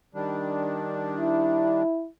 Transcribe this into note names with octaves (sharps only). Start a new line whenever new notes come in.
D#3 G3 D4
E4